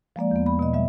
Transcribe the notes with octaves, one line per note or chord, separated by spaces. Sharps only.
F3 G#3 A#3 D5
E2 B3
B5
B2 D#5
G3 E5